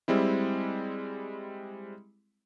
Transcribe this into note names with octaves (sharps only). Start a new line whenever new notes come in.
G3 G#3 C4 E4